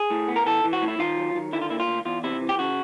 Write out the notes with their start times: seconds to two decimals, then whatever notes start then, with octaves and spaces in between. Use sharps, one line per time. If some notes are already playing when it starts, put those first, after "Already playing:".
Already playing: G#4
0.10 A2
0.28 B3
0.36 A#4
0.46 E3 A4
0.64 E3
0.73 F#4
0.82 A2
0.88 E4
0.99 D#3 F4
1.17 F#3
1.35 D#3
1.53 D3 E4
1.61 F4
1.70 A#3 E4
1.80 F4
1.88 D2
2.05 E2 F4
2.24 C3 E4
2.41 E3
2.49 G4
2.59 C#3 F#4